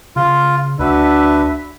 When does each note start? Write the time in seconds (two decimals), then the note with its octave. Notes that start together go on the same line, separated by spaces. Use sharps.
0.16 C#3 F4
0.79 D2 D4 F#4 B4 E5